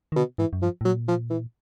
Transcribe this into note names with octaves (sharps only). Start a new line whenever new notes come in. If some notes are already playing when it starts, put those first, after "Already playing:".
D#3
B2 D3
G#2 E3
F#2
G2 F3
A2
A#2 F#3
F3
E3